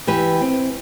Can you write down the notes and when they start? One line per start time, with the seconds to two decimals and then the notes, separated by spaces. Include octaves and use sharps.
0.07 E3 G4 B4
0.41 C4